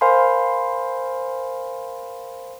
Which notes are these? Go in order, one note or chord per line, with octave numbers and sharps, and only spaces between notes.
A#4 C5 F5 G#5 B5 C6